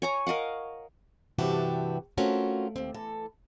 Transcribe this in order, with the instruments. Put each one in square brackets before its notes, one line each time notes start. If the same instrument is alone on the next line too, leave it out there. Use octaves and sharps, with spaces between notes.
[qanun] C#5 G#5 A#5
A#4 D#5 F5 F#5
[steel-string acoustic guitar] G2 C3 E3 F#4 G4 A5
A3 C4 C#4 F4 F#4 A#4
D#2 C4
E3 A4